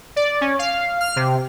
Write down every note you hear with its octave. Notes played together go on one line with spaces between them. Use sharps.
D5
C#4
F5
F6
C3